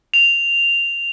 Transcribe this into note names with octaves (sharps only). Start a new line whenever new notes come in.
F7